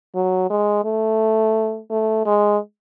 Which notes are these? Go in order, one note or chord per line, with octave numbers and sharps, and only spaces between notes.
F#3
G#3
A3
A3
G#3